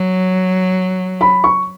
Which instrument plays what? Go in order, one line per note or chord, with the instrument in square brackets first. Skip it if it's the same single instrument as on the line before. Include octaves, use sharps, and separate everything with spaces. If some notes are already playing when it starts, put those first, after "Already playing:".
Already playing: [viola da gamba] F#3
[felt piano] B5
C#6